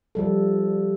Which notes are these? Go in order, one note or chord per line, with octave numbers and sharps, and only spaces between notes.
F3 G3 A4